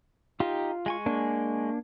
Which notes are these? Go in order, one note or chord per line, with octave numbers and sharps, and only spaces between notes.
D#4 F4 G4
G#3 G#5 C#6
A#3 D4